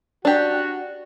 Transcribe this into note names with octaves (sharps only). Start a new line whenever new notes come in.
D4 F#4 G4